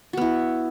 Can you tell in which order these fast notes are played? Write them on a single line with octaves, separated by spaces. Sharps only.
F#4 B3 E4